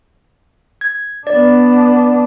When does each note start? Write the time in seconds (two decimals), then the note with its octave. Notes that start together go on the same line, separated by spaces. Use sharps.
0.81 G#6
1.27 B3 D4 D5